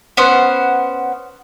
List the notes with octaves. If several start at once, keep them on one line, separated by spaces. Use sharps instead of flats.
B3 C#4 C5 F#5